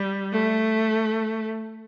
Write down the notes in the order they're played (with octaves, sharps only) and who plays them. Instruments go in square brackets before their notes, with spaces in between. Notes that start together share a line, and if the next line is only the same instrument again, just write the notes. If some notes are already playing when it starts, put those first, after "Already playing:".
Already playing: [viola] G3
A3